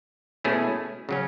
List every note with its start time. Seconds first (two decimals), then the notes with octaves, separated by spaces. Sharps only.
0.44 B2 A3 C#4 E4 G#4
1.09 C#3 F#3 C#4